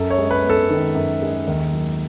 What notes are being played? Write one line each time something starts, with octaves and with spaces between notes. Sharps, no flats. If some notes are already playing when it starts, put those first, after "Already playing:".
Already playing: F#2 A4
C#5
G#3
B4
B3
A4
D#3
F#2
G#3
D#2
F#3